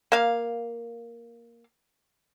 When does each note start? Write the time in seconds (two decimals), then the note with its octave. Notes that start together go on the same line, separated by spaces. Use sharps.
0.12 A#3 F5